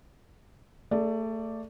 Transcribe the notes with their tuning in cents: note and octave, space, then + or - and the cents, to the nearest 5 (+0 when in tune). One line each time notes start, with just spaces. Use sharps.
A3 +25 G#4 +0 D5 +0